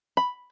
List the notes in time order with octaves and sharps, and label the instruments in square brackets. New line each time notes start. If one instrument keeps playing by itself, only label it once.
[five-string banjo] B5